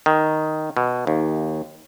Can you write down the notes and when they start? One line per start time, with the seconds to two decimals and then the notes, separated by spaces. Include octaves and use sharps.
0.06 D#3
0.77 B2
1.07 D#2